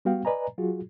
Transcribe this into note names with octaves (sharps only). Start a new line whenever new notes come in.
G3 B3 F#4 F5 G5
B4 D5 D#5 G#5 A#5
F#3 F4 F#4 G#4